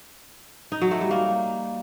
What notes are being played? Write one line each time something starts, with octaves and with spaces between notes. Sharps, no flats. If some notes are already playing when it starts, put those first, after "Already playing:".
D#4
F#3
A3
G3
A#3